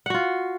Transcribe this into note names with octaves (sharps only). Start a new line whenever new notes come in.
F4 F#4 F#5